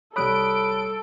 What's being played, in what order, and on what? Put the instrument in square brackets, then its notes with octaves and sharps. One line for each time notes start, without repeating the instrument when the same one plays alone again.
[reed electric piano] C2 G3 C#5 [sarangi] A4 [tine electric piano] B5 D#6 F#6 [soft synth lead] D7